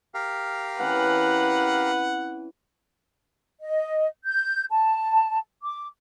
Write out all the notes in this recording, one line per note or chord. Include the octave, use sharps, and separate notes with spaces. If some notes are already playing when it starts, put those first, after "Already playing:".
G4 A#4 F5
E3 C4 C#4 B4 F#5
D#5
G6
A5
D6